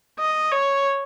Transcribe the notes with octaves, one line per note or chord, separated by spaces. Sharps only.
D#5
C#5